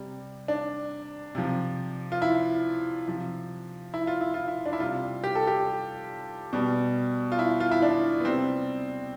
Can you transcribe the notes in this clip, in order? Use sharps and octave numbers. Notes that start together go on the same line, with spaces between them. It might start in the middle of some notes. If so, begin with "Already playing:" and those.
Already playing: C3 G3
D4
C3 F3
F4
E4
C3 F3
E4
F4
E4
F4
E4
D4
E4
C3 G3 F4
G4
A4
G4
B2 G3
F4
E4
F4
E4
D4
B3
C3 G3 C4